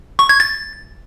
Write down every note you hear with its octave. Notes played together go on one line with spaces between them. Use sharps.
C#6
G#6
A6